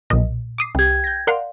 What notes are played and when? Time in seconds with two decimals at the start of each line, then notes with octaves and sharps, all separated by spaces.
0.10 B1 A#2 D#5
0.58 D6 D#6 C7
0.75 C2 G4 G5 G#6
1.04 G6 A#6
1.27 A#4 D5 F5 F#5 C6